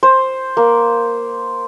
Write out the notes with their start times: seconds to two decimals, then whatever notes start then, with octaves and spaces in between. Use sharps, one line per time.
0.03 C5
0.57 A#3